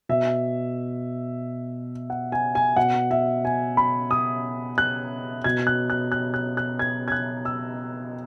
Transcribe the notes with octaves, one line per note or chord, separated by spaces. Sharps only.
B2 E5
F#5
G#5
G#5
B2 F#5
E5
G#5
B5
D#6
F#6
B2 G#6
F#6
F#6
F#6
F#6
F#6
G#6
G#6
F#6
E6